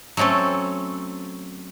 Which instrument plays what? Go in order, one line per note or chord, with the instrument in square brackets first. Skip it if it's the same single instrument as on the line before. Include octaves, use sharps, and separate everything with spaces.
[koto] F#3 A3 C4 C#4 A4